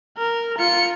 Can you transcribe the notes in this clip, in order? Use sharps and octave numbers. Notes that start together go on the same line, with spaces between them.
A#4
F4 C#7